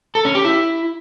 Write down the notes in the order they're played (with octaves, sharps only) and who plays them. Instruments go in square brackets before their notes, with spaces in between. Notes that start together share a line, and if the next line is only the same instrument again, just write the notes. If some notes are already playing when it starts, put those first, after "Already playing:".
[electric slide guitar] A4
C#4
G4
E4